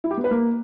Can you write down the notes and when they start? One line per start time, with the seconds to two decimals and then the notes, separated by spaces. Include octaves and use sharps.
0.04 E4
0.11 G4
0.17 B3
0.24 B4
0.31 A#3